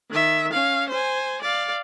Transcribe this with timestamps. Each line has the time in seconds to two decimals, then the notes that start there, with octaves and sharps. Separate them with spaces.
0.10 D#3 E5
0.52 C#4 F5
0.89 C5 G#5
1.42 D5 F5